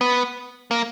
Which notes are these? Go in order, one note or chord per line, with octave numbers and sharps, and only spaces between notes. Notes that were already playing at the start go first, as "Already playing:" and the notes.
B3
A#3